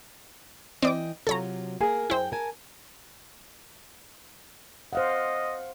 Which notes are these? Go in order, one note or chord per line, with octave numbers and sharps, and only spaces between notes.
E3 C4 D5 D#5 G5 D6
C3 F#3 F4 A4 C#5 A#5
A#3 G#4 A#4
F#2 E4 C5 G5
A#4 G#5 A5
C5 D#5 F5 F#5